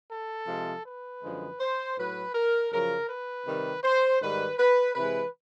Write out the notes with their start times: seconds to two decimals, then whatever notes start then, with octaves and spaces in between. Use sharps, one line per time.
0.10 A4
0.47 C3 F3 G#3
0.85 B4
1.22 F#2 D3 F3 G#3
1.60 C5
1.97 A2 F#3 B4
2.34 A#4
2.72 F#2 C#3 F3 A#4
3.08 B4
3.46 C3 D#3 G3
3.83 C5
4.20 G#2 D#3 G3 B4
4.58 B4
4.95 C3 E3 G#3 B4